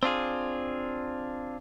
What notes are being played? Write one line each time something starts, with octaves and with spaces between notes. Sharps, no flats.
C4 D4 F4 G#4